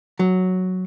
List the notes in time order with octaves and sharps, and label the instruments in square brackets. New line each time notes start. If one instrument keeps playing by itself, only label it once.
[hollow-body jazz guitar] F#3